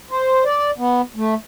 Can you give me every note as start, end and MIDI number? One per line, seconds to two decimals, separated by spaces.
0.11 0.44 72
0.45 0.71 74
0.78 1.01 59
1.16 1.35 57